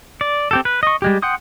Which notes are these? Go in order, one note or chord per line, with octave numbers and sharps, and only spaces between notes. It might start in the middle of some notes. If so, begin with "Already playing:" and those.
D5
C4 G4 A4
B4
D#5 C#6
G3 G#3 G4
F#5 G5 C6 D#6